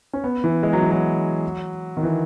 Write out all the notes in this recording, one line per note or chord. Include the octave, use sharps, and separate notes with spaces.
C#4
B3
E3
G#3
F#3
E3
F#3
D#3
E3